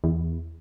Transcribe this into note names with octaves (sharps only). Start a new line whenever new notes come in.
E2